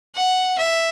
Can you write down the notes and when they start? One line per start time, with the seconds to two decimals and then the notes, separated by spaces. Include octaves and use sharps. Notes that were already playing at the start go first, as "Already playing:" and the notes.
0.15 F#5
0.58 E5